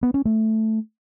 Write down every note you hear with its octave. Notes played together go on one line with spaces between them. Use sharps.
B3
C#4
A3